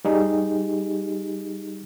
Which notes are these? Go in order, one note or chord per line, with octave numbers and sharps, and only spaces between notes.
G3 D#4 G4 G#4